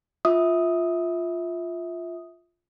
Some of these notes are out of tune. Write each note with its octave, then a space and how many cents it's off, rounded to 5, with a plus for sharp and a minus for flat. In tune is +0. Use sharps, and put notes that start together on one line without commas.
F4 +0 E5 -20 D#6 +0